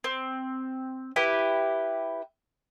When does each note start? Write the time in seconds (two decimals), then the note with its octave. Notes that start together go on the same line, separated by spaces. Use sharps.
0.04 C4
1.16 E4 G4 B4